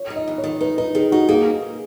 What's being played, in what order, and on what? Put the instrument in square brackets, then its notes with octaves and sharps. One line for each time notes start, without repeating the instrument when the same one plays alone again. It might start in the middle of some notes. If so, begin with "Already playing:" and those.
Already playing: [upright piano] C#5
[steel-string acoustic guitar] D#4
[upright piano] D#5
[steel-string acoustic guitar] E2
[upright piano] C#5
[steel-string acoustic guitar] D#3
[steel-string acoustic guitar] D#4 [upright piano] B4
[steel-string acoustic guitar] D#4 [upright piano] B4
[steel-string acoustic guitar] D#3 [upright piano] G#4
[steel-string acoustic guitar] D#4 [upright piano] F#4
[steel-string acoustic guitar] A#3 [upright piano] G#4